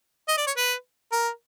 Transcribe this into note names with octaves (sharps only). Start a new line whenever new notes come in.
D#5
D5
C#5
B4
A#4